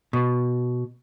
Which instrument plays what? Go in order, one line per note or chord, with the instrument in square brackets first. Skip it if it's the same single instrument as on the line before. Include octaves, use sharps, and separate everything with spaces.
[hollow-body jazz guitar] B2